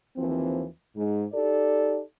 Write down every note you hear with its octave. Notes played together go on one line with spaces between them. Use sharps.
D#2 E3 F3 C4
G#2
D#4 G4 A4 D5